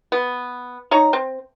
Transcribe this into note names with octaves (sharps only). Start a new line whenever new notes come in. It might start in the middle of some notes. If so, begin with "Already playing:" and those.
B3
D#4 C#5 A#5
C4